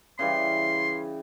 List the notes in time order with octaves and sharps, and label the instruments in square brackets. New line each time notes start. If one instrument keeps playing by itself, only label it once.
[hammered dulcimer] C#3 E3 G3 [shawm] C6